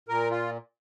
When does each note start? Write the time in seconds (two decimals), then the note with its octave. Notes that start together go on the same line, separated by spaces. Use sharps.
0.09 A#2 A#4
0.31 F4